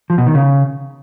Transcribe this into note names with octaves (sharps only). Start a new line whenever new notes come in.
F3
B2
D#3
C#3